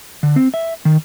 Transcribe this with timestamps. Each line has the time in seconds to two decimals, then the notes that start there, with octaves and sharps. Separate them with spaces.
0.23 D3
0.36 C4
0.54 E5
0.85 D#3